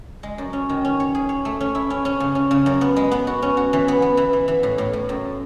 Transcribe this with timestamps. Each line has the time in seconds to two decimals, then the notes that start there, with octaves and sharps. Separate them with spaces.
0.23 G#3
0.38 F#2
0.53 C#4
0.69 D#3
0.85 C#4
1.00 C#5
1.15 G#4
1.29 C#5
1.45 A3
1.60 C#4
1.75 E4
1.90 C#4
2.05 C#4
2.20 C#3
2.35 C#4
2.51 C#3
2.66 F#2
2.81 B3
2.96 G#3
3.11 B3
3.27 F#4
3.42 C#4
3.57 F#4
3.73 E3
3.88 B3
4.02 B3
4.17 E3
4.33 E3
4.48 E3
4.63 A2
4.78 A2
4.93 A2
5.09 F#2